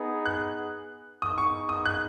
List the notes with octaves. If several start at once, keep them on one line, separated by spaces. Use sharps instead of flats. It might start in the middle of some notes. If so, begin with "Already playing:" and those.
Already playing: B3 D#4 G#4
F#6
B3 D#4 G#4 D#6
C#6
D#6
F#6